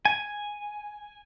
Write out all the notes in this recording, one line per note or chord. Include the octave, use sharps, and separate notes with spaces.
G#5